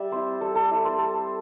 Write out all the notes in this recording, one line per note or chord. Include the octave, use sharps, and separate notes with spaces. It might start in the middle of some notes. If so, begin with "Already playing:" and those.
Already playing: G3 D5 E5
C4 E4 C5
G3 A4
A4
C4 E4
C5
G3 A4